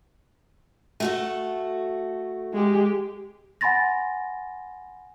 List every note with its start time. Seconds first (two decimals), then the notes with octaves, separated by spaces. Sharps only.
1.00 A3 F#4 A4
2.54 G#3 G4
3.61 F#5 G#5 B5 C6 A6 A#6